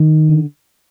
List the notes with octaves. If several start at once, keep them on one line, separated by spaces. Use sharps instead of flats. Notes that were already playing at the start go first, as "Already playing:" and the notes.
Already playing: D#3
D3